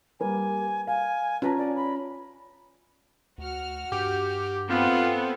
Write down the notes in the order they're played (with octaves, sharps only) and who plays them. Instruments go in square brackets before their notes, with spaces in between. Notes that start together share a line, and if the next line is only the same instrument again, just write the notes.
[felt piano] G3 A#3 B4 [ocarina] G#5
[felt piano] F5 [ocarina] G#5
[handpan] C#4 [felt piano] F4 A5 A#5 [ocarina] B4
[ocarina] D5
B5
[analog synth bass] D2 [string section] F#4 F6
[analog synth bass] G2 [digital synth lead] G4
[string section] B3 A4 [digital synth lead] C4 [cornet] F4